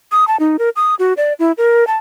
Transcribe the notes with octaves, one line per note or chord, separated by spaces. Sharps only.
D#6
A5
D#4
A#4
D#6
F#4
D5
E4
A#4
A5